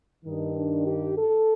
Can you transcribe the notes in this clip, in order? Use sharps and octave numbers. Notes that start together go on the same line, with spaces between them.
G2 D#3 D#4
D4
G4
A4